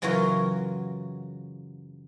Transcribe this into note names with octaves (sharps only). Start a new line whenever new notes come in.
F#2 C#3 E3 F#3 F4 F#4